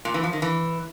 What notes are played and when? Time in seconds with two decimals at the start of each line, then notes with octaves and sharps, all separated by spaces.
0.05 A#2
0.14 E3
0.24 F3
0.33 D#3
0.42 E3